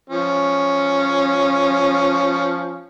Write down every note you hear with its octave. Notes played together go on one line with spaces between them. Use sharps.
F3 C#4